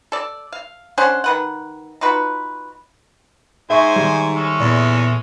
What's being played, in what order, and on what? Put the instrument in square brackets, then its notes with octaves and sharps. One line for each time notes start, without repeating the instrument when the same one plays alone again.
[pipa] A4 D5
F5
C#4 D4 C5 F#5
D#3 B4 F#5
D#4 F4 F#4 B4
[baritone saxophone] G#2 [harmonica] C5 D#5 G#5 [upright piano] E5 C#6
[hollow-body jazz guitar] D#3 G3
[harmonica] G#3 C#4 A4
[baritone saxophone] E2 [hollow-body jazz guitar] A#2